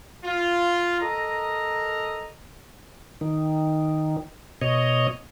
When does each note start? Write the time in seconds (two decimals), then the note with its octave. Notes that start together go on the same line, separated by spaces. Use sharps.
0.24 F4
1.01 A4 A#4 D#5 A#5
3.21 D#3
4.61 B2 C#5 D#5